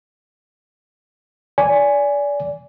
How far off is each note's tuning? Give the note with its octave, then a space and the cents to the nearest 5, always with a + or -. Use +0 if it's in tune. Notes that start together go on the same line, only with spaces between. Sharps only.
D5 -25 G#5 +0